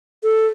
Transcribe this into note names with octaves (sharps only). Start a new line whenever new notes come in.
A4